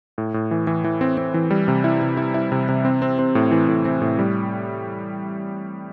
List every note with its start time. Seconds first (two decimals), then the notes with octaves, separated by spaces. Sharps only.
0.18 A2
0.34 A2
0.51 E3
0.67 E3
0.84 E3
1.01 C4
1.18 C4
1.34 E3
1.51 G3
1.68 C3
1.84 E4
2.02 C3
2.17 E4
2.34 E4
2.52 C3
2.69 C3
2.85 C4
3.02 C4
3.19 C4
3.35 A2
3.51 E3
3.69 A2
3.85 C4
4.01 A2
4.19 G3